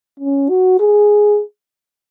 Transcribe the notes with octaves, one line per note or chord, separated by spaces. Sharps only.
C#4
F#4
G#4